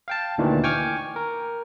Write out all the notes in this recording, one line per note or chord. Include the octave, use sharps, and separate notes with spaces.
F5 G5 A5
D2 A#2 D#3 E3
G5 G#5 C#6 D6 F6
A#4